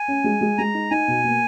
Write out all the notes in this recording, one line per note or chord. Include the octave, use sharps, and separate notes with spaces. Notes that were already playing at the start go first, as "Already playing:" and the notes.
Already playing: G#5
C#4
G#3
G#3
G#3 A#5
D#4
D#4 G#5
B2
A#3